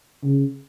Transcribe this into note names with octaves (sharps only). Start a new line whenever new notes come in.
C#3